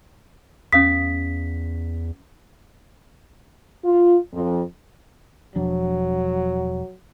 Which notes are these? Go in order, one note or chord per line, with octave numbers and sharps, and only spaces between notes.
E2 C#4 F5 D#6 B6
F4
F2
E1 F3 F#3 D4